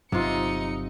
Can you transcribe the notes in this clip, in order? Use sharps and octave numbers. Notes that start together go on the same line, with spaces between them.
G1 G2 C3 F#3 D#4 F4 C#7